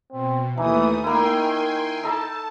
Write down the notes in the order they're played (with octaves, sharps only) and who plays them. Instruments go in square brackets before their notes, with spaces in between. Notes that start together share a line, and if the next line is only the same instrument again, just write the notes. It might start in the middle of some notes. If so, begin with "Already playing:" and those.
[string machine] B2 [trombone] C4
[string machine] D#2 A3 D#6 [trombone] E3 [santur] D#4
[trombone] D#3 [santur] A#3 E4 [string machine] G5 G#5 C6
[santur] D#4 A4 B5 [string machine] A5